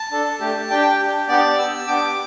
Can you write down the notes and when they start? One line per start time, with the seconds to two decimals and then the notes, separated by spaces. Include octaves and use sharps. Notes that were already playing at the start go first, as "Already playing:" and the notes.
Already playing: A5
0.11 D4 A4
0.40 A3 D4 G4
0.70 D4 G4 G5
1.00 D4 G4
1.28 B3 D4 G4 D5
1.58 B3 G4 E6
1.87 B3 D4 G4 D6